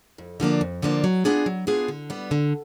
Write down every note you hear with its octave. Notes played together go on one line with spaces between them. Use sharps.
F2
D3 F3 A#3 D4
F2
D3 F3 A#3 D4
F#3
B3 D4 F4 G#4
F#3
B3 D4 F4 G#4
D3
G3 B3
D3